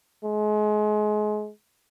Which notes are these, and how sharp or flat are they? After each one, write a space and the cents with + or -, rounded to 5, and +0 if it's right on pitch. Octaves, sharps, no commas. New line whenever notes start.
G#3 +30